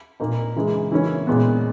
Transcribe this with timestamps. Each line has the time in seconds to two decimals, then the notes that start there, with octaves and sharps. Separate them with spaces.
0.20 A#2 A#3 D#4
0.56 C#3 E3 G#3
0.91 C#3 E3 A#3 C#4 E4
1.27 A#2 G#3 B3